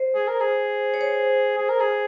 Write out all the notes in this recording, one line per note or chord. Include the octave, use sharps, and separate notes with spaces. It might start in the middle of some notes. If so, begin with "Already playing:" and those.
Already playing: C5
G#4
A#4
G#4
C#5
C5
G#4
A#4
G#4